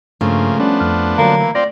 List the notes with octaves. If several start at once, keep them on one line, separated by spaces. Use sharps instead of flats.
G2 C#3 F3 A3 A#3
F3 G3 B3 C#4 D4
F2 F6
D3 F#3 A#3
E3
C4 F4 D5 A#6